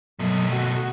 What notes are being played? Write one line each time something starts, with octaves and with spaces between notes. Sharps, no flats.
B2 F#3 A3
F#4